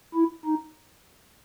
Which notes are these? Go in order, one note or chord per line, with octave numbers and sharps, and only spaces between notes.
E4
D#4